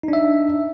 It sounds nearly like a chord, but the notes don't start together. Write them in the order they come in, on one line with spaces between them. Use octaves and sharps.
D#4 D4 E5